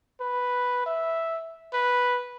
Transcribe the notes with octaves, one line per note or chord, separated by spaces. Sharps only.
B4
E5
B4